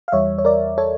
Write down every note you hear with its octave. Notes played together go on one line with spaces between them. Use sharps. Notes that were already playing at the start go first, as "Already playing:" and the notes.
F5
E2 E3 G3 C#5 E5
C#5
A#4 D5
A4 C#5